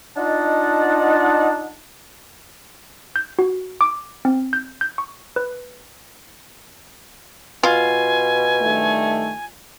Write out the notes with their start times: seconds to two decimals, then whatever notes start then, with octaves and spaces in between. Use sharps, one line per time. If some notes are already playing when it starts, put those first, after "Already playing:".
0.17 D4 D#4 F4 D#5 F#5 A5
3.16 G6
3.39 F#4
3.81 D6
4.25 C4
4.53 G6
4.81 G6
4.98 C#6
5.36 B4
7.63 B2 F4 G#5
8.62 G2 D#3 A3